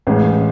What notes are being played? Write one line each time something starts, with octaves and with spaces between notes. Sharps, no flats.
A1 A2 G#3 C#4